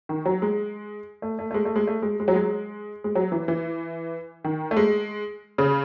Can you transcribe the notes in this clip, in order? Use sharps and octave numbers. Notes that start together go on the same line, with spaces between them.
D#3
F#3
G#3
A3
A3
A3
G#3
A3
G#3
A3
G#3
G#3
F#3
G#3
G#3
F#3
E3
E3
D#3
A3
G#3
C#3